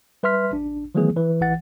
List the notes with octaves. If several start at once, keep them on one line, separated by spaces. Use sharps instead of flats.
G3 B4 E5 C6 F6 B6
A1 D4
D#3 E3 F#3 A3 B3 G#4
E3 B4
A1 E3 F#5 A6